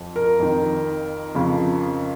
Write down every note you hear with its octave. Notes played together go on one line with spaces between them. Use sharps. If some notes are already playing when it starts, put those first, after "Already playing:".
Already playing: F2 F3
A#4
F2 D#3
F2 C#3 F3